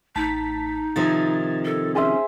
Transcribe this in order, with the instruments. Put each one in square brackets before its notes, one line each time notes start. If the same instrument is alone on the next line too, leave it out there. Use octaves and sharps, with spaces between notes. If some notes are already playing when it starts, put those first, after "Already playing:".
[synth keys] A1 A5 B6 [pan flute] D#4
[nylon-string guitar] C3 D#3 F3 [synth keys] G#6 A6
[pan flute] A4
[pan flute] C#4 [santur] G#4 C5 E5